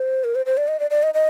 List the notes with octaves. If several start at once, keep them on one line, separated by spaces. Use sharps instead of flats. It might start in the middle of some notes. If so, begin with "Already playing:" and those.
Already playing: C5
A#4
C5
C5
D5
D#5
D5
D5
D#5
D#5